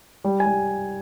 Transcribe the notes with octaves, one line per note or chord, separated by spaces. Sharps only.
G3
G#5
G3